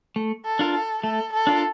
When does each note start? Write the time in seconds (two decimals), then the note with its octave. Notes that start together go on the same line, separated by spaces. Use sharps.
0.16 A3
0.45 A4
0.59 D4 F4 A#4
0.74 A4
1.03 A3 A4
1.33 A4
1.47 D4 F4 A#4